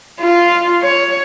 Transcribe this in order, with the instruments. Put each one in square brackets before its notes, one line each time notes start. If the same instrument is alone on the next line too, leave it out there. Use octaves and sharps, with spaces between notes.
[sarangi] F4
C#5